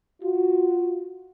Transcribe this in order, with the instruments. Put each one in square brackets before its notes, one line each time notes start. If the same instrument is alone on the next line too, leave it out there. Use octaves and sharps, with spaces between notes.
[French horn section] F4 F#4